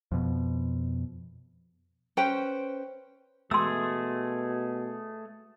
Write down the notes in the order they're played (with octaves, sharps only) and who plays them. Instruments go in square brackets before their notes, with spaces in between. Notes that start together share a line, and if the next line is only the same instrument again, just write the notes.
[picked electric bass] F2 B2
[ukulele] C#4 B4 C5 G5
[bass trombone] B2 [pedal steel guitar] A3 G#4 [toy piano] C6 E6